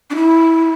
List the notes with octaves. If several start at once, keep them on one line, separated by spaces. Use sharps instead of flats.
D4
E4